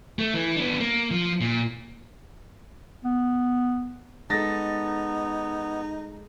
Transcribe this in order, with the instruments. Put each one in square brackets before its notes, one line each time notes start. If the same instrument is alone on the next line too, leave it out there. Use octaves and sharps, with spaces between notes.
[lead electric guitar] A3
E3
B3 D4
A#3
F3
A#2
[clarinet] B3
[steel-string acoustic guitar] G#3 A4 [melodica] B3 [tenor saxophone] D#4 [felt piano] A6 A#6